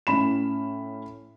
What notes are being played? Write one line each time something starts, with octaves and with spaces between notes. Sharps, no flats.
A2 C#4 B5 E7